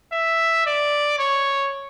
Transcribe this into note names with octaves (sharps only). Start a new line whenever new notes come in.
E5
D5
C#5